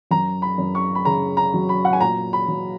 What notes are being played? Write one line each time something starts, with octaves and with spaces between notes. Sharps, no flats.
F#2 A#5
B5
F#2
C#6
B5
C#3 A#5
A#5
F#3
B5
F#5
G#5
A#2 A#5
B5
F#3